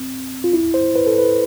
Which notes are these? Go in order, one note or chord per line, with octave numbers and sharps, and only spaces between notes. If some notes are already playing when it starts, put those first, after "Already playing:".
Already playing: C4
F4
E4
C5
B4
A4
B4